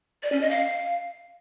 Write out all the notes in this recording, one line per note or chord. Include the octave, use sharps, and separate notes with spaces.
D5
C#4
D#5
F5